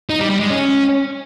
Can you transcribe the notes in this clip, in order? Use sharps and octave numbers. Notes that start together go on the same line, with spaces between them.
D#4
G3
G3
G#3
C#4